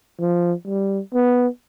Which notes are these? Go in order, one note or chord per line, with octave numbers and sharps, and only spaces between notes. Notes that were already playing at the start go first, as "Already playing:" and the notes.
F3
G3
B3